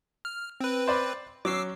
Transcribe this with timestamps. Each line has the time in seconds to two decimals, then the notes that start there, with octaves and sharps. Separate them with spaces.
0.25 F6
0.61 C4 B4
0.87 C5 D5 B5
1.45 F#3 C#4 D6 E6 C7